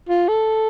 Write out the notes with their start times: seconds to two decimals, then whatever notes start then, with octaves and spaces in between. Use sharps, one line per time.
0.09 F4
0.28 A4